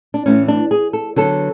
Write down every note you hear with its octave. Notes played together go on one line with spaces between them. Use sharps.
D4
A2 E3 A3 C#4
D4
G#4
A4
D3 F#3 B3 A4